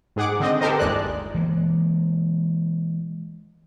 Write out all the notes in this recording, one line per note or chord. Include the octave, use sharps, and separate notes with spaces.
G#2 G#4 F#5 D6
D3 C4 D#5
B3 G4 A4 A#4 C5 D#5
G1 D#2 G#3 D5 F#6
E3 G#3 A#3